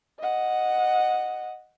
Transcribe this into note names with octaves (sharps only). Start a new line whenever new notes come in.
D#5 F#5